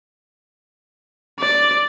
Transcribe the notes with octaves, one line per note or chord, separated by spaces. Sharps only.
D5